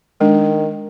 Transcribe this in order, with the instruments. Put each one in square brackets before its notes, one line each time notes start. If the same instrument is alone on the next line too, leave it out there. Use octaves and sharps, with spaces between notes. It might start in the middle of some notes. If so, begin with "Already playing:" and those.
[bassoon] D#3 [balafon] G#3 D4